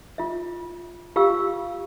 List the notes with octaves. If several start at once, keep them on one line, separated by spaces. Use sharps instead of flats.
F4 E5
F4 G4 F5 G5 E6